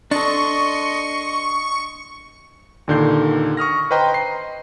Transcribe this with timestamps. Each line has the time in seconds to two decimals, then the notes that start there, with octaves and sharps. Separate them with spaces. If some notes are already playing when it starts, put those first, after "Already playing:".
0.11 D4 A4 D#5 C6 C#6
2.88 D#2 A#2 D3 D#3 G6 C7
3.57 C#6 D#6 F6 A#6
3.91 B4 C5 D#5 G5 A#5 C6
4.14 C7